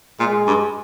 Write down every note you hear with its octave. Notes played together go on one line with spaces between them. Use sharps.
A#2 G#3
G2